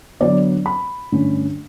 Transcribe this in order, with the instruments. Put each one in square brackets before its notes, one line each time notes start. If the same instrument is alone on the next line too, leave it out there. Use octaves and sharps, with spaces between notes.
[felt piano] D3 F#3 B3 D5
B5
G2 D3 A3 C#4